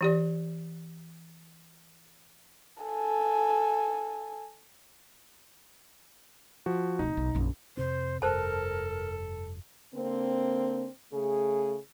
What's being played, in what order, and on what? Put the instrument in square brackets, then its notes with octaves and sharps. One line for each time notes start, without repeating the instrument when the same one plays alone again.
[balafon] E3 G4 D5
[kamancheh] A4 G#5
[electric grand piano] F3 F#4
[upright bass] D1 C3 [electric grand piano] D#4
[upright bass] B1
A#1 F#2
[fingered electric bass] F2 C3 C4 [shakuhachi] C5
[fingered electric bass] F1 G2 [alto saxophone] A4 [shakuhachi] A#4 [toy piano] C5 A5
[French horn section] D3 A#3 C4
C#3 A3 G#4